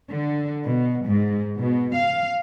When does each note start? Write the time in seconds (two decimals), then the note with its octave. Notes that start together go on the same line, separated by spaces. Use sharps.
0.10 D3
0.67 B2
1.06 G#2
1.59 B2
1.96 F5